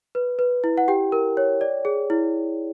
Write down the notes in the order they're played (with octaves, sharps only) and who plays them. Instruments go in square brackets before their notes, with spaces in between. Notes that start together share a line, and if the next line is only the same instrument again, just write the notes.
[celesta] B4
B4
E4
F#5
G4 G5
A#4
C#5
D5
G#4
E4